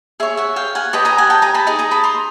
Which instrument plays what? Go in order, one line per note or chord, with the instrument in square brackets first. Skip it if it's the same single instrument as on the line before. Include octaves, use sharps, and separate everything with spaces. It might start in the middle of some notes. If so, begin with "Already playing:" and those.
[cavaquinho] G#4 C#5 E5
E5 F#5
F5 G5
F#5 G#5
G4 B4 D#5 G5 A5
G#5 A#5
F#5 G#5
G5 A5
G#5 A#5
A5 B5
D#4 G#4
G#5 A#5
A5 B5
A#5 C6